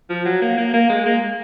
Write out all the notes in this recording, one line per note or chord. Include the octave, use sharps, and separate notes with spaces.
F3
F#3
A#3
A#3
A#3
G#3
A#3